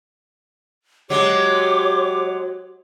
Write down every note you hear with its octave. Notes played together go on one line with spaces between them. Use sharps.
F#3 G#3 G4 C#5 D6